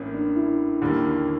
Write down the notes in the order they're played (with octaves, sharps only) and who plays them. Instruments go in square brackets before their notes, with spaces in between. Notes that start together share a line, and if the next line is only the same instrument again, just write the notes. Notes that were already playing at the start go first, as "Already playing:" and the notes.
Already playing: [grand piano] A1 A2 A#3 [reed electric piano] C#4
[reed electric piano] D4
E4
[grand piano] D#2 D3 G3 A#3